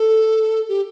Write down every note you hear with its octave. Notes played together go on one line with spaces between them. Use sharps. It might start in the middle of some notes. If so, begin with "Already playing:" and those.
Already playing: A4
G4